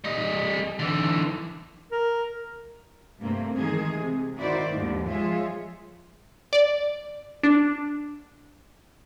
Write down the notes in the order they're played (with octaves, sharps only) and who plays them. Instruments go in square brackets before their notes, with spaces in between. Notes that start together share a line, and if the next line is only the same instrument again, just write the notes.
[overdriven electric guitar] G3 D#5
D3 E3
[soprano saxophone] A#4
[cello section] G2 C3 A3 A#3 C4
D#3 E3 G#3 A3 G#4
C3
D#3 E4 F#4 C5 D5
D#2 G#2 D3 F3
F3 G#3 F4 G#4 C#5 E5
[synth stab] D5
D4